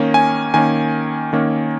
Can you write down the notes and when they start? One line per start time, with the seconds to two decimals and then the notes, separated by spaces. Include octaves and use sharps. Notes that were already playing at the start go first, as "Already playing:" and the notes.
Already playing: D#3 A#3 C#4
0.14 G#5
0.54 D#3 A#3 C#4 G#5
1.33 D#3 A#3 C#4